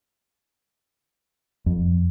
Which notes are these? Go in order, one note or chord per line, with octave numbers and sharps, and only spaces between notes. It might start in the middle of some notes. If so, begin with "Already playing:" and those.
F2